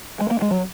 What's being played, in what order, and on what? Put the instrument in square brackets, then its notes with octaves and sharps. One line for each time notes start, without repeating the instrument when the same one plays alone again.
[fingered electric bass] G#3
A#3
G#3
F#3